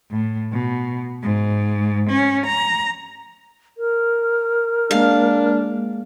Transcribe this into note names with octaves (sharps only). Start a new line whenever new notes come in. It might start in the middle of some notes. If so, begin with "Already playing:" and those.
A2
B2
G#2
C#4
A#5
A#4
G#3 A#3 D4 F5